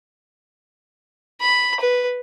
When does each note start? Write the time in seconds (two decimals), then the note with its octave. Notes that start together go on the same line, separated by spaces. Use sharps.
1.41 B5
1.80 B4